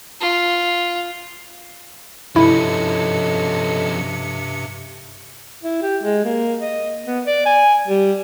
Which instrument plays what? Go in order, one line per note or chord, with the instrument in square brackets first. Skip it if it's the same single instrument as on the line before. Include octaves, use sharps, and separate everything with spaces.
[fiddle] F4
[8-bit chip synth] G2 C3 C#7 [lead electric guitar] F3 C#4 [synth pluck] E4 [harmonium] A4 D#5
[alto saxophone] E4
G4
G#3
A#3
D#5
B3
D5
G#5
G3